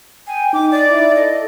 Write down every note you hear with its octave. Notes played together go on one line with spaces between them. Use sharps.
G5 G#5
D#4 D6
D5
E4
A4 D#5